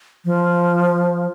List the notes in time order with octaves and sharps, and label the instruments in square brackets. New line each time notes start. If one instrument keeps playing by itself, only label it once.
[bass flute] F3